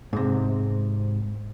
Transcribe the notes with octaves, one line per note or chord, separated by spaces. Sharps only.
G#2 C3